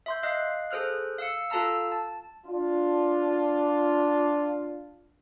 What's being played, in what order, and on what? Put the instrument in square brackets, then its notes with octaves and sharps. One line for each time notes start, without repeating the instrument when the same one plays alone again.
[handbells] E5 C6 G6
D#5 F5 F#6 C7
G#4 A4 C5 F6 F#6
F5 E6 C#7
F4 A4 F5 A5 A#5 E6
A5
[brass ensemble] D4 F4